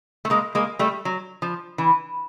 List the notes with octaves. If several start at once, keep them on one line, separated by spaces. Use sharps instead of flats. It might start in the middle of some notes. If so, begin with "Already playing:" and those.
A3
G#3 A#3
G#3 A#3
G3 A3
F#3
F3
E3